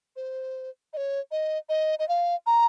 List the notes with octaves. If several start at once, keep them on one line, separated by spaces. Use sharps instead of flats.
C5
D#5
C#5
D#5
D#5
D#5
F5
A#5